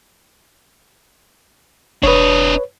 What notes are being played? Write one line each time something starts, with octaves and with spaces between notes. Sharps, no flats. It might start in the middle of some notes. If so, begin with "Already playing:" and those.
E1 D4 B4 C#5 D#5